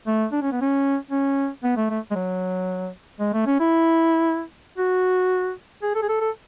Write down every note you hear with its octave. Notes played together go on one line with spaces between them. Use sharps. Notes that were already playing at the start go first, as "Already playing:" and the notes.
A3
D4
C#4
B3
C#4
C#4
B3
A3
A3
G#3
F#3
G#3
A3
C#4
E4
F#4
G#4
A4
G#4
A4
A4